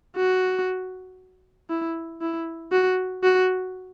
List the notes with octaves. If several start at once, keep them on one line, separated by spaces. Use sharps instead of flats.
F#4
E4
E4
F#4
F#4